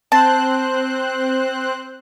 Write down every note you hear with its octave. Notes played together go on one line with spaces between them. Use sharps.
C4 C5 A5 F#6